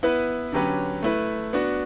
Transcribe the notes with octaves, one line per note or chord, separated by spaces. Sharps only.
B3 E4 B4
D3 F#3 C#4 G4 B4
A3 E4 B4
B3 D4 F#4